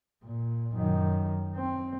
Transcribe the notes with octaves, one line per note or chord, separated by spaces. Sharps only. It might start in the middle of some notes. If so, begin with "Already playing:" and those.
A#2
F#2 D#3
C4